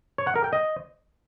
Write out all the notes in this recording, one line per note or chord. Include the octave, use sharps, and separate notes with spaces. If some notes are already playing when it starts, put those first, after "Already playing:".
C#5
F#5
A#4
G5
D#5